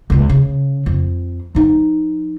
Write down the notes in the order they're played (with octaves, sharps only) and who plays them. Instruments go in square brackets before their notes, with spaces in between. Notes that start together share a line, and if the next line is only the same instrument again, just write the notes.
[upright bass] C#2 B3
C#3
F2
F3 D#4